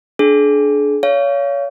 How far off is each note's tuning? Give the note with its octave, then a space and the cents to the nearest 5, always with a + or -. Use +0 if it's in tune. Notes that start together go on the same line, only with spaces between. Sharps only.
D4 +0 G#4 +40
C#5 +30 F5 -20